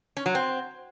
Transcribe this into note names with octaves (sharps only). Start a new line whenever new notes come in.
C#4
F#3
C4